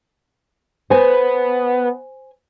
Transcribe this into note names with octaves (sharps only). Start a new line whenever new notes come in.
B3 C5 G#5